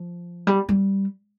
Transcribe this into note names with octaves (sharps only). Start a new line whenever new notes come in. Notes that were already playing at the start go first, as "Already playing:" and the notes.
Already playing: F3
G3
G3